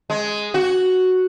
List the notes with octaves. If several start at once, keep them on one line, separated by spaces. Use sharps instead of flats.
G#3
F#4